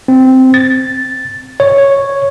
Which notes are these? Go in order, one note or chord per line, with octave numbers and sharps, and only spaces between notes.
C4
A6
C#5